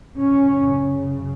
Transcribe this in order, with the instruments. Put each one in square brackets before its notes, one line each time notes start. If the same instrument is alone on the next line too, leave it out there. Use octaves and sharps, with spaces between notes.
[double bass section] F#2 C#3 C#4